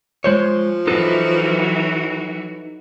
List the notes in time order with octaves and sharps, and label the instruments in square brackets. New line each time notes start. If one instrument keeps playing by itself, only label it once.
[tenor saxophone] F3 [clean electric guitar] G#3 C5 C#5
[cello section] E3 F#3 F#4 [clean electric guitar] D#4 A4 B4